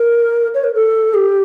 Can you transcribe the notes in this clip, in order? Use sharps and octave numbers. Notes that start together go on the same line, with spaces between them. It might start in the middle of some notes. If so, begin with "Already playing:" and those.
Already playing: A#4
C#5
A#4
A4
G4